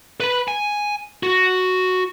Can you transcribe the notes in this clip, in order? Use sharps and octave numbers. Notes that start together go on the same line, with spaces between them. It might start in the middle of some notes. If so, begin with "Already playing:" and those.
B4 B5
G#5
F#4